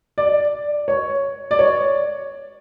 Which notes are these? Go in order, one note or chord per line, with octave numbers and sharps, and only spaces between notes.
D5
C#5
D5
C#5